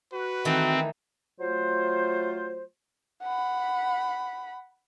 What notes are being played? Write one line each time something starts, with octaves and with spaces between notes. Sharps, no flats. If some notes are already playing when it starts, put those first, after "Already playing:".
F#4 B4
D#3 E3 A3 C4
F#3 A3 F4 C5
F#5 B5